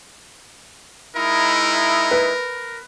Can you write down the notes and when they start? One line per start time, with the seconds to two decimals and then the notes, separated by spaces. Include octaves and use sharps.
1.16 G#3 D#4 E4 A#4
2.11 B4